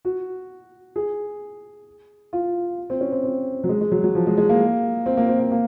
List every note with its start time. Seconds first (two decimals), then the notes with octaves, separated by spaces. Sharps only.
0.05 F#4
0.96 G#4
2.33 F4
2.90 C4
3.01 C#4
3.12 C4
3.24 C4
3.64 F#3
3.69 G#3
3.81 G#3
3.92 F#3
4.04 F#3
4.15 F3
4.27 G#3
4.37 G#3
4.49 A#3
5.06 C4
5.17 A#3
5.29 C4
5.40 A#3
5.52 A#3